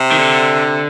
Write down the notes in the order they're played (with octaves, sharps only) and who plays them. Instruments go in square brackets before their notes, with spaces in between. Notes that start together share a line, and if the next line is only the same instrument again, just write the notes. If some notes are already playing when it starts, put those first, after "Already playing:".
Already playing: [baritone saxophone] C3
[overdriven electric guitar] D#3
D3